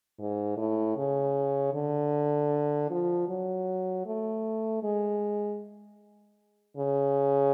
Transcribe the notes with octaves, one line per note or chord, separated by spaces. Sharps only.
G#2
A2
C#3
D3
F3
F#3
A3
G#3
C#3